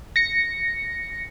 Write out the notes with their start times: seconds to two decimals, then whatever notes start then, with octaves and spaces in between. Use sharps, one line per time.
0.16 A#6 C#7